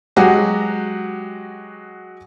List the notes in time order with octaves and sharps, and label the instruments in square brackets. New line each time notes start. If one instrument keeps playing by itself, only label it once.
[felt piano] F#3 G#3 F#4 G4